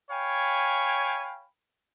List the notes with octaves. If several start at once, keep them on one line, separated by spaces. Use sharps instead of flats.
C#5 F5 G5 G#5 B5